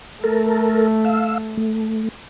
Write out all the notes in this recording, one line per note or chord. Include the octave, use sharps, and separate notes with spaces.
A3 A4 A#4
F5 E6
A3